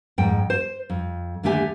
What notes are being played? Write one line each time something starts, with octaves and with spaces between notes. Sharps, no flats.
F2 G#2 G5
C5
F2
D#2 D3 A3 G4 G#5